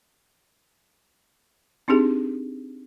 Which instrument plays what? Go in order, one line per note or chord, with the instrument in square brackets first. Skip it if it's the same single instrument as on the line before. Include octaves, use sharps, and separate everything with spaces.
[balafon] C4 D4 D#4 G4 G#4